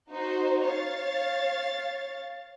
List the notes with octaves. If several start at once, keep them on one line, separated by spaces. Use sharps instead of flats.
D#4 F#4 C5
C#5 F5 A6